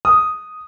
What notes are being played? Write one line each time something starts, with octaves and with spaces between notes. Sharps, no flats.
D#6